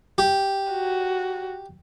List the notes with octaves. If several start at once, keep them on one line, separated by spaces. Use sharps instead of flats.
G4
F#4